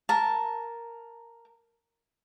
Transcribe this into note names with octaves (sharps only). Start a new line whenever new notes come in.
A#4 A5